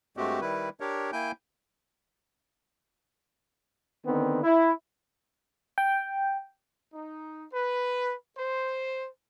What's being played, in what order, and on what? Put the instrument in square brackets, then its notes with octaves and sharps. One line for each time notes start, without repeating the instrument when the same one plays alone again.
[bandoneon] G2 G#3 A3 C4 F#4 G4
D#3 G3 E4 B4
D4 G4 A#4 C#5
A#3 E4 G5 G#5 G6
[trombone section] D3 D#3 B3 C4
E4
[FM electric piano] G5
[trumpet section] D#4
B4
C5